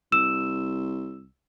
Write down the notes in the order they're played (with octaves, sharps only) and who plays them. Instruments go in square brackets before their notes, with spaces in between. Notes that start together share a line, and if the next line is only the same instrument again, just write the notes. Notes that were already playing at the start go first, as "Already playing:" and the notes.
[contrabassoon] C2 [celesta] E6 E7